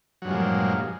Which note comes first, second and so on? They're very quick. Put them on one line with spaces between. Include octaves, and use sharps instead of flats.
F#3 G2 G#3 F3 A#2